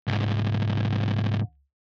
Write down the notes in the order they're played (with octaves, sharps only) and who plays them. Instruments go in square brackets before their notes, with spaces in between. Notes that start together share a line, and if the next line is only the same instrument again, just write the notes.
[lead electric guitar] C2 G#2